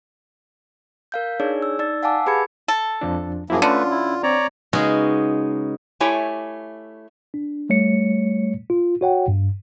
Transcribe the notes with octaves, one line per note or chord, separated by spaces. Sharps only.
A#4 F5 G6
D4 D#4 G#4 C#5 D5
E6
D#4 D5 E6 A6
F5 F#5 G#5 A5 D6 E6
G4 G#4 B4 B5 G#6 C#7
A4
F2 F3 D4
F#2 F3 A#3 E4 F#4 G#4
D3 A3 C#4 F4 B4
E4
C4 C#5 D5 A#5
C#3 G#3 B3 D#4 F#4 G#4
A3 E4 G4 C#5 G#5
D4
G3 A3 C#5 C#7
F4
F#4 C#5 F#5 G5
G2